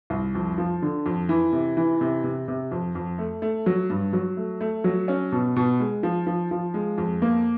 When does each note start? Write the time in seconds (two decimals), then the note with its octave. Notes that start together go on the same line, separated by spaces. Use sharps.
0.10 C2
0.35 F2
0.58 F3
0.82 D3
1.06 F2
1.29 E3
1.53 C3
1.77 E3
2.01 C3
2.24 C3
2.48 C3
2.71 F2
2.95 F2
3.18 A3
3.42 A3
3.66 F#3
3.90 G2
4.13 F#3
4.37 A3
4.61 A3
4.84 F#3
5.08 C#4
5.32 B2
5.56 B2
5.80 G#3
6.03 F3
6.27 F3
6.51 F3
6.74 G#3
6.98 F2
7.22 A#3